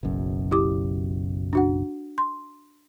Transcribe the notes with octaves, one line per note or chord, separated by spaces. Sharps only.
F#1 B1 F#2
E4 G4 D6
D4 F#4 F#5
C6